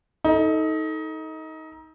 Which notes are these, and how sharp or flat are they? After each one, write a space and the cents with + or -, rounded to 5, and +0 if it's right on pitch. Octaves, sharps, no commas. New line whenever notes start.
D#4 +25 A4 +0